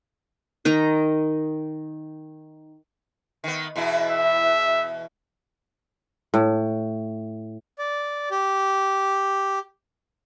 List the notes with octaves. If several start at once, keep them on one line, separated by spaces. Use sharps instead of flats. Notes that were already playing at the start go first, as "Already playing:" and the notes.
D#3 D#4 A#5
D#3 B3
E2 B2 E4
E5
A2
D5
G4